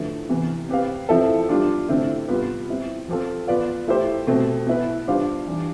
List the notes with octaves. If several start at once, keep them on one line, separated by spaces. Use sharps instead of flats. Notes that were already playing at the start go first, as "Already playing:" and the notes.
Already playing: D3 F3 A3 E4 B4
C3 E3 B3
C4 G4 B4 F5
F3 C4 E4 A4
G3 D4 F4
D3 A3 C4 E4
C3 G3 B3 F4 B4
G3 C4 E4
F3 C4 F4 A4
B3 F4 B4 D5 F5
A3 E4 G4 C5
B2 A3 C4
B3 E4 B4
G3 D4 F4 C5 F5
E3 G3 D4 G4